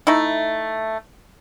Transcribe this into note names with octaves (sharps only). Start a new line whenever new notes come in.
A3 D#4 E4